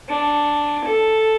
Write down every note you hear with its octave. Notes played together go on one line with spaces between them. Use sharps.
D4
A4